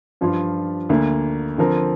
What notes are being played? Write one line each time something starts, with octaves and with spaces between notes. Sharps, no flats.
G2 F3 D4 F4
D2 D3 A#3
D3 F3 C4 A#4